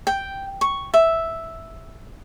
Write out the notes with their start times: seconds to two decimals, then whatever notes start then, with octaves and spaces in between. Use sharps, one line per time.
0.07 G5
0.61 C#6
0.94 E5